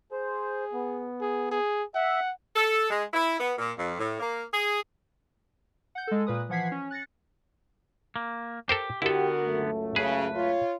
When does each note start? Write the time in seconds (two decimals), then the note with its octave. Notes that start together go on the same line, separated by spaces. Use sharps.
0.12 G#4 C5
0.73 B3
1.21 G#4
1.51 G#4
1.95 E5 F#5
2.55 A4
2.89 G#3
3.12 E4
3.39 B3
3.57 A#2
3.77 F2
3.98 A2
4.19 A#3
4.52 G#4
5.95 F#5 G6
6.07 G#3 A4
6.26 A#2 B4 D#6
6.49 E3 F3 F#5 G#6 B6 C7
6.72 C#4
6.90 F#6 A6 A#6 C#7
8.16 A#3
8.69 G4 A4 A#4 C5
9.02 D3 B3 E4 F#4 G4 A4 A#4
9.44 C#2 F#2 A3
9.96 C#3 G#4 B4
10.35 F4 C#5